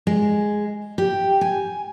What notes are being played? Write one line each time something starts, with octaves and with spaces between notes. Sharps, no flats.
G#3
G4
G#5